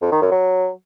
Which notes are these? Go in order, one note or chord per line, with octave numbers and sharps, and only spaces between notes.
F2
D#3
F#2
F#3